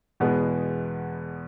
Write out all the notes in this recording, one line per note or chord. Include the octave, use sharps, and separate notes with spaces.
E2 B2 G#3 B3